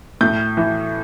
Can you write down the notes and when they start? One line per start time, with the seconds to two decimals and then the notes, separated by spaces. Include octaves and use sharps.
0.21 A2 G6
0.57 E3